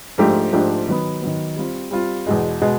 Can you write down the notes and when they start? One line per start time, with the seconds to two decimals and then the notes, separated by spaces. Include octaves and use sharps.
0.18 G#2 F3 A3 D4 G4
0.52 G#2 F3 A3 D4 G4
0.88 D#3 F#3 B3
1.22 D#3 F#3 B3
1.56 G3 C4 F4
1.91 G3 C4 F4
2.26 E2 B2 G#3
2.61 B2 G#3